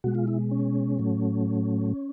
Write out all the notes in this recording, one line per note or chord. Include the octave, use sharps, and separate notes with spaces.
B2 G#3 F#4
F4
E4
C#4
A2 F#3 A3